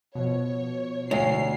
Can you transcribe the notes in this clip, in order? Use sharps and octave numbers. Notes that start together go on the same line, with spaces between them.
B2 F3 C#5
D2 C#5 C7